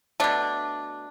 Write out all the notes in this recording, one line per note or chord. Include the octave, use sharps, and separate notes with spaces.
B2 A3 D4